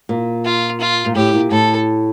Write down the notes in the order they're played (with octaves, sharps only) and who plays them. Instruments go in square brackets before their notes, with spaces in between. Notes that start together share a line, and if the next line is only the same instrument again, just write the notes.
[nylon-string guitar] A#2
[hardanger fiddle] F4
F4
[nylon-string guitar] A#2
[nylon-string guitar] A2 [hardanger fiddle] G4
[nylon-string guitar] A#2
[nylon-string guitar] A2 [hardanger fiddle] A4